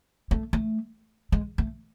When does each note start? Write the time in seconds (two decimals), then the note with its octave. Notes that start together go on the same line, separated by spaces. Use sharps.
0.31 A3
0.53 A3
1.32 G#3
1.58 A3